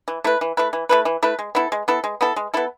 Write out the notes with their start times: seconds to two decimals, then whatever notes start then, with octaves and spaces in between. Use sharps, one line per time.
0.08 E3
0.24 A3 E4 B4
0.41 E3
0.57 A3 E4 B4
0.73 E3
0.89 A3 E4 B4
1.05 E3
1.23 A3 E4 B4
1.39 G#3
1.55 B3 E4 A4
1.72 G#3
1.88 B3 E4 A4
2.04 G#3
2.21 B3 E4 A4
2.36 G#3
2.54 B3 E4 A4